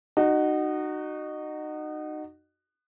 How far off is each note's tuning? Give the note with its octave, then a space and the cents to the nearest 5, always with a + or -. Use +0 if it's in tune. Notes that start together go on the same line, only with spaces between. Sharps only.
D#4 -25 F#4 +10